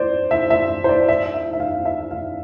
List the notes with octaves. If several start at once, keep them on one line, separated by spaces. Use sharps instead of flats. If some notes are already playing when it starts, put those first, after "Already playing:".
Already playing: C5 D5
E5
E5
C5
D5
E5
E5
E5
F5
E5
F5